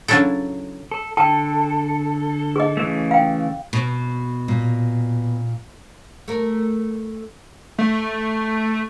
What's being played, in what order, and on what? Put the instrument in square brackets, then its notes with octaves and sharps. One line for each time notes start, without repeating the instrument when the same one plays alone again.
[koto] C#3 F#3 C#4 D4 E4 A4
[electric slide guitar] A4
[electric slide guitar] D3 A4 [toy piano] G5 A5
[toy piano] G#4 D#5
[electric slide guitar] C#3 E3 A3
[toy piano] F5 G5
[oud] B2
[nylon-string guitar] A#2
[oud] A3 A#4
[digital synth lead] A3